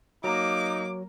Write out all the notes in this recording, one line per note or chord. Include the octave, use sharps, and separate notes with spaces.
F#3 A#3 D#4 D6